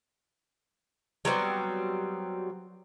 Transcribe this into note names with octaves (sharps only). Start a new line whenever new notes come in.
F#3 G3 B3 C4